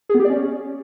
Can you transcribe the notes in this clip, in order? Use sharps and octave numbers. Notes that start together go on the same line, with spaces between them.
G#4
B3
G4
D5
C#4